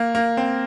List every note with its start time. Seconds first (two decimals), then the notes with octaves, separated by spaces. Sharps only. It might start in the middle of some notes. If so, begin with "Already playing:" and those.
Already playing: A#3
0.15 A#3
0.37 C4